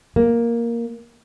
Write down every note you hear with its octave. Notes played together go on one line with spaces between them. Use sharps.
A#3